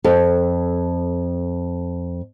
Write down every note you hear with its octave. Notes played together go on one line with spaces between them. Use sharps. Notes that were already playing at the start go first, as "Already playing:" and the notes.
F2 A4